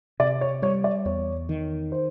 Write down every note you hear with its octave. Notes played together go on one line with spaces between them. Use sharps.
C3 D5
C#5
G3 C#5
D5
E2 C#5
D#3
C5